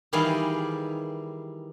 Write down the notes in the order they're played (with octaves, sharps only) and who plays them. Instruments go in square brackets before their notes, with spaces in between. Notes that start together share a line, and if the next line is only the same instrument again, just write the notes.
[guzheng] D#3 E3 G3 G#4 D5 F5